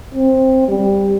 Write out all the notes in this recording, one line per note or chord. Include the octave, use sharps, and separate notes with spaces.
C4
G3